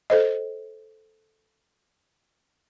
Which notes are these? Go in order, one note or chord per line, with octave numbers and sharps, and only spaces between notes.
A4 C5 D#5